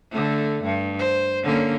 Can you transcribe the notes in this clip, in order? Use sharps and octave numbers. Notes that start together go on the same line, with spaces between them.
D3 A3
G2
C5
D3 A#3 C#4